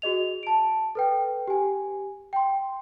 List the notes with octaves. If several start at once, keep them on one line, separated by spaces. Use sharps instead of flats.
F#4 G#4 D#5 F7
A5 D7
A4 B4 G5
G4 G#5
G5 C6